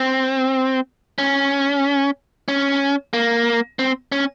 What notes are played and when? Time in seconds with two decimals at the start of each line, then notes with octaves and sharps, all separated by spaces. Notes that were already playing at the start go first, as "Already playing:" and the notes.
Already playing: C4
1.18 C#4
2.48 C#4
3.13 A#3
3.79 C4
4.12 C#4